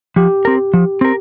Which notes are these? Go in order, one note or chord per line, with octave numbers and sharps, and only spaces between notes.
F3 G4
C4 A#4
F3
C4 A#4